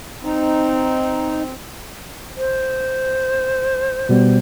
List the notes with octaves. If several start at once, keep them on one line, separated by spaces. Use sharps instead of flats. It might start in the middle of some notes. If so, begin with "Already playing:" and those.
C4 D#4
C5
B2 G3 B3